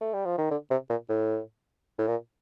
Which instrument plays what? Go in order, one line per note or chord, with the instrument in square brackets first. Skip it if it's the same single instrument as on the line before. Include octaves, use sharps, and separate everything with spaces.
[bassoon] A3
G3
F3
D#3
D3
C3
A#2
A2
A2
A#2